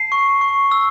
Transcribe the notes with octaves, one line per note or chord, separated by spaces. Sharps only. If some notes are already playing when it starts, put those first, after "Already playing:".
Already playing: A5 C7
C#6
C#6
E6